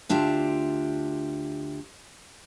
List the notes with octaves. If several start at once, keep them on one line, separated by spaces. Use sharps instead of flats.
D2 D4 F4 G4 E5